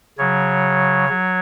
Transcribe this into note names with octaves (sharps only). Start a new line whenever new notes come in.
C#3 F#3 C#5
F#3